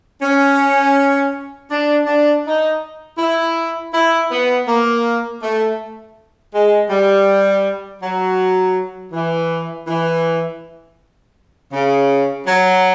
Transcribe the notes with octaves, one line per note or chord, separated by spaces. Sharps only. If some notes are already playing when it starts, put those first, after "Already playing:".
C#4
D4
D4
D#4
E4
E4
B3
A#3
A3
G#3
G3
F#3
E3
E3
C#3
F#3